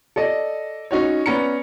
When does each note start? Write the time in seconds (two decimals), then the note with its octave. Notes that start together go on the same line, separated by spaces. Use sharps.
0.16 A4 D5 D#5
0.91 C#4 D#4 F#4 C#5
1.26 B3 C#4 D5 A#5 C#7